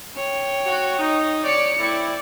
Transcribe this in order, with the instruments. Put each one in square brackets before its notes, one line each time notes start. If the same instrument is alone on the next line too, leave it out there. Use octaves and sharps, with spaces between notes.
[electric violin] C#5 G5
[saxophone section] F#4
D#4
[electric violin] C#5 C#7 [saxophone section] D5
[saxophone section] A2 C4 E4 [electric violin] D5